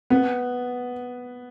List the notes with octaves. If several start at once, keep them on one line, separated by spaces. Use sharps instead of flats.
B3